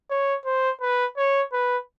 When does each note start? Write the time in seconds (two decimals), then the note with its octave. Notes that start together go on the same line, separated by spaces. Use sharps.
0.10 C#5
0.45 C5
0.81 B4
1.17 C#5
1.53 B4